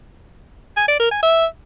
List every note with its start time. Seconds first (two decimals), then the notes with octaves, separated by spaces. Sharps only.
0.77 G#5
0.88 D5
1.00 A#4
1.11 G#5
1.23 E5